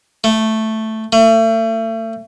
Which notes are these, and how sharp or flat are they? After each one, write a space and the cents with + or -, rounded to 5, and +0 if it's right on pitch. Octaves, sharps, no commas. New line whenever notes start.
A3 +0
A3 +35